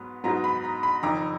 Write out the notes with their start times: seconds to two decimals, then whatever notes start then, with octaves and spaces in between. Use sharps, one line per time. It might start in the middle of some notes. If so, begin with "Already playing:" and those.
Already playing: G#2 F#3 B3
0.24 G#2 F#3 B3 D#4 A#5
0.44 B5
0.64 A#5
0.83 B5
1.03 F#1 F2 D#3 A#5